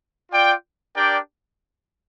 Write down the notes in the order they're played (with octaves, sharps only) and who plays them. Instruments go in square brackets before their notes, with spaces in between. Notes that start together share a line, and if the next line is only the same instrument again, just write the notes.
[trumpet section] F4 D5 G5
D4 G4 A#4 D5 G5